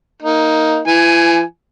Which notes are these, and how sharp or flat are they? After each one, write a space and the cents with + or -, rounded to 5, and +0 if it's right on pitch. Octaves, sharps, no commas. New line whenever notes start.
A#3 +0 D#4 +10
E3 +40 G#5 +5